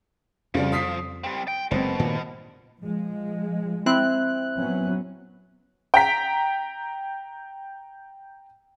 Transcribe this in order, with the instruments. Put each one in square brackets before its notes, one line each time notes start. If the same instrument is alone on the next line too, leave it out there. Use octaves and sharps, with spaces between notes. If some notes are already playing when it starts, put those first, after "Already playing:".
[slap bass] F2 [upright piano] C#3 G3 [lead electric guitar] F3
[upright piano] D#6 B6 C7
[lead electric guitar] G3 C4
G5
[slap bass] F#1 G#3 C4 [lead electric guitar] B2 [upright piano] C5
[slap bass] G2 A#2 D#3
[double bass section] F3 G#3
[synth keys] C4 E4 F#6
[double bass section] F#3 B3 C#4
[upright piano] G5 A#5 B6